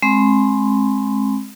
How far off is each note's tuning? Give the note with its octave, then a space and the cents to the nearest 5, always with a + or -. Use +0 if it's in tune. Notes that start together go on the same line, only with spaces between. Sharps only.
G#3 +20 C4 +30 B5 +45